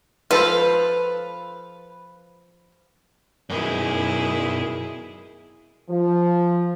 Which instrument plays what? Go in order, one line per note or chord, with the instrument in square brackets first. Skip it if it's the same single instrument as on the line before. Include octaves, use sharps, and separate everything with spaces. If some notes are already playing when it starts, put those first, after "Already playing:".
[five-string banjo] F3 A4 C5 [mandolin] B4 F5
[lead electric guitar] B1 F#2 [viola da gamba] E4 G#4
[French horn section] F3